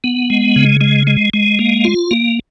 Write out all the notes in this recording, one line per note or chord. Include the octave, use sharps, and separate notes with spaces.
B3
G#3
C#3
G#3
G#3
G#3
A#3
F4
A#3